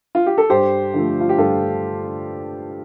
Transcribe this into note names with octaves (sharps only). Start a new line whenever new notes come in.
F4
G4
A4
G2 G4 C5
D3 F3 A3
F4
G4
G2 F4 A4